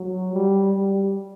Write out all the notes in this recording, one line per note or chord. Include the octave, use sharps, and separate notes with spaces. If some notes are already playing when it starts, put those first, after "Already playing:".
Already playing: F#3
G3
G3